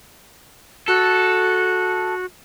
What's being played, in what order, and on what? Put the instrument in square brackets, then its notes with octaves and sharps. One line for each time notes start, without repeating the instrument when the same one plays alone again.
[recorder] F#4 [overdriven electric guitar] A4